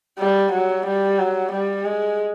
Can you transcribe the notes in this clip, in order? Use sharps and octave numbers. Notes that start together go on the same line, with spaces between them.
G3
F#3
G3
F#3
G3
G#3